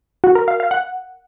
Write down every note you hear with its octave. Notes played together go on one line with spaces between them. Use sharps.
F#4
A#4
F5
F5
F#5